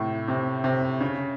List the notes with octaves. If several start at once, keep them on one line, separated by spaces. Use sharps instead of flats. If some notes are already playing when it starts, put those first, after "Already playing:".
Already playing: A2 C3
C3
C3
C#3